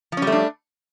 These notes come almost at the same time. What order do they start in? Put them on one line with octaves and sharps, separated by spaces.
F3 C#4 G3 A3 D4